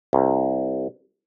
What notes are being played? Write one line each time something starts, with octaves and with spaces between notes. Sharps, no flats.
C2